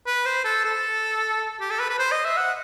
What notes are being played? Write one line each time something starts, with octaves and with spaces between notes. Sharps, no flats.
B4
C5
A4
A4
G4
A4
B4
B4
C5
D#5
E5
F#5